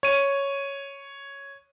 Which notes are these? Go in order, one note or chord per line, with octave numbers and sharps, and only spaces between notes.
C#5 D#7